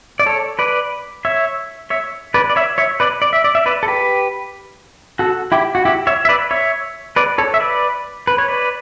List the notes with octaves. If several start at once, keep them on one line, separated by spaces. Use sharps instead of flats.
D5
A4 C#5
B4 D5
C#5 E5
C#5 E5
B4 D5
D5
C#5 E5
C#5 E5
B4 D5
D5
E5
D5
E5
B4 D5
A4
G4 B4
F#4 A4
E4 G4
F#4
E4 G4
C#5 E5
E5
B4 D5
C#5 E5
B4 D5
A4 C#5
E5
B4 D5
B4
C#5
B4 D5